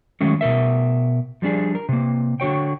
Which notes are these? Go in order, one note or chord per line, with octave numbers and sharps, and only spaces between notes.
D#3 F#3 G#3 A3 C#4
B2 E3 A#4 E5
F3 G3 D4 G#4
A#4
C3 A#3
D3 F#4 C#5 G5